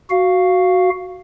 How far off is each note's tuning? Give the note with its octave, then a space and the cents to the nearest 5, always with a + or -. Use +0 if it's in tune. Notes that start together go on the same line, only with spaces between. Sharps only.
F#4 +0 F5 +0